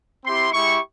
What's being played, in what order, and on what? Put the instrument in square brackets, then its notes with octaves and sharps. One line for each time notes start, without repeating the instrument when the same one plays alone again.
[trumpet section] C4 E4 G4 C6
G#3 E4 G4 C#6